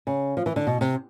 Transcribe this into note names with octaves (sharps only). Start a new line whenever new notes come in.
C#3
F3
E3
D3
B2
C3